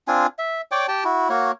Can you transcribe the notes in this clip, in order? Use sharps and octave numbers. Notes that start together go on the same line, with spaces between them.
C4 D4 F4 G#5
E5
C#5 D5 G5 D6
G4 G5 A5
E4 F#4
A#3 F#4 C#5